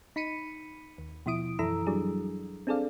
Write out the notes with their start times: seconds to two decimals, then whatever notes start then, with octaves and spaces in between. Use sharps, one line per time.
0.16 D#4 B5 B6 C#7 D#7
0.98 D#2
1.26 B2 F3 E4 D#6 D7
1.59 F#2 E3 E4 A4 A#5 E6
1.87 F#3 G3 D4 G#4
2.67 C4 D4 G#4 A4 D5 F5